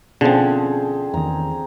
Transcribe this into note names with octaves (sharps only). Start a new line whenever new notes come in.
B2 D3 F3 C4 C#4 G#4
E2 D#3 A#5